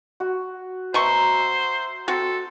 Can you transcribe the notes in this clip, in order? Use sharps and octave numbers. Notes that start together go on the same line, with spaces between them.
F#4
B2 C5 E5 A#5 C#6
C4 F#4 A4